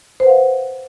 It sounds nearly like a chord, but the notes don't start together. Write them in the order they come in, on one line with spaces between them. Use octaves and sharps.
C5 B4 F#5 F5